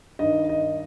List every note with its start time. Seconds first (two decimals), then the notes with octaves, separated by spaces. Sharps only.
0.19 G2 D#3 D#5
0.49 D#5